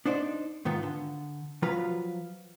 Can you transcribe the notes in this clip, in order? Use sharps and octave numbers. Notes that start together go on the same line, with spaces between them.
D4 D#4 C5 D5
G#2 D#3 B3 F4
D3
F3 F#3 F4 B4 A#5